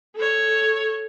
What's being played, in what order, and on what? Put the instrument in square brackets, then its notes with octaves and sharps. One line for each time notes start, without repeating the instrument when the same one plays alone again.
[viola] A4 C#5